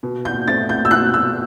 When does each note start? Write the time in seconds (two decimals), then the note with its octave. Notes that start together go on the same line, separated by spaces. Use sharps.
0.03 B2
0.25 G6
0.48 A3 C4 A6
0.69 G6
0.85 E6
0.91 B2 F#6
1.14 E6